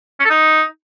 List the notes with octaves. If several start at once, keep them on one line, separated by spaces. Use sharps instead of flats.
C#4
A4
D#4